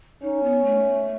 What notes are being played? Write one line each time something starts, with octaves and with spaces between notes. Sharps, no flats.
C#4 D#4
B3
A3